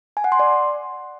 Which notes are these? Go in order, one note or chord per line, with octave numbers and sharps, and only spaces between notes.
G#5
F#5
C6
D5